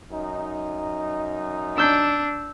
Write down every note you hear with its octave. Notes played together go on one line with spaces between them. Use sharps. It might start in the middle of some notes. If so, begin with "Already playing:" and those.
F#2 D#4
D4 E6 G6